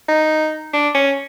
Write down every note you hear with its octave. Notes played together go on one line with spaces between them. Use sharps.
D#4
D4
C#4